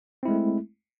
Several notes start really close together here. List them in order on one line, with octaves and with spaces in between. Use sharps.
C4 E4 G#3 A3